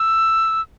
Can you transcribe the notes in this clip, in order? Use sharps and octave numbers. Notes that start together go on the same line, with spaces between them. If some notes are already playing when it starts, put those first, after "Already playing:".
Already playing: E6